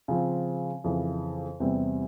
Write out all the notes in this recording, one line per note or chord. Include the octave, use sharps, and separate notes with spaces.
C#3 F3 C4
F2 C#3 E3
E2 C3 G3 C4